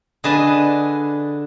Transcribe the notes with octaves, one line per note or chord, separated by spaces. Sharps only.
D3 G#4 B4 D#5 A5